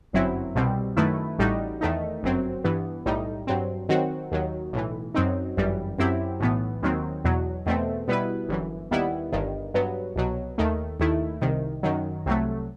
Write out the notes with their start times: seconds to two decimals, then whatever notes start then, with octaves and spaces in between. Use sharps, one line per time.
0.13 G1 F#2 F#3 C4 E4
0.55 C2 B2 G3 C4
0.97 F#2 D#3 A3 E4 B4
1.39 A1 A2 G3 D#4 F#4
1.81 E2 D#3 A3 D#4
2.23 G1 F#2 F#3 C4
2.64 G2 E3 B3
3.06 B1 A2 G3 D#4
3.47 G2 F#3 C4
3.89 D#3 F#3 C4 F#4
4.32 D#2 D#3 F#3
4.73 B1 A2 E3
5.14 F#2 F#3 C4 D#4
5.57 G1 F#2 E3 G3
5.99 F#2 F#3 C4 E4 G4
6.40 B1 A2 E3 B3
6.82 D#2 D#3 F#3 C4
7.24 E2 B2 F#3
7.66 E2 B2 A3 C4
8.08 B2 G3 B3 E4 B4
8.49 G1 F#2 E3
8.91 D#2 D#3 G3 B3 E4
9.32 G1 G2 D#3
9.74 G2 F#3 B3
10.16 C2 B2 F#3
10.58 D#2 D#3 A3
11.00 D#2 D#3 A3 E4
11.42 C2 C3 D#3
11.83 F#2 D#3 F#3
12.26 C2 C3 F#3 A3